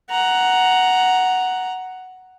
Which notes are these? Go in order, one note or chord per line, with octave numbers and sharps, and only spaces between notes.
F#5 A#5